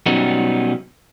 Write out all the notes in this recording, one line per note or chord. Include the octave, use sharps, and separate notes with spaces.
B2 F#3 G3 B3 C#4 D#4